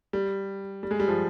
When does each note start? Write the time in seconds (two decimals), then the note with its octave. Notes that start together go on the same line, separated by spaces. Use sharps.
0.13 G3
0.83 G3
0.91 G#3
1.00 G3
1.08 F3